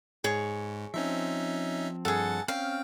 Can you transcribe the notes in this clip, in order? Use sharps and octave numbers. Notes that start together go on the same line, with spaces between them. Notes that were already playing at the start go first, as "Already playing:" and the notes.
G#2 G#4 C#5
F3 C4 C#4 D#4 E5
G2 G#4 A4 F#5 A6
C4 C#4 F5 G5